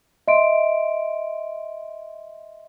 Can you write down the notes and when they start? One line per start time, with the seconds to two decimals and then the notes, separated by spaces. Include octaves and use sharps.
0.28 D#5 E5 C6 D7